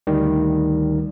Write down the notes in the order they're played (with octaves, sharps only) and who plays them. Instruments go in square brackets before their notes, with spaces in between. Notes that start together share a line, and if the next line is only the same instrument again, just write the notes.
[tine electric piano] D2 D#3 G3